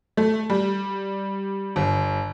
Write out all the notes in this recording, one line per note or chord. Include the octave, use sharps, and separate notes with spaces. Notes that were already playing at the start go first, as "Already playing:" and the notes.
A3
G3
G1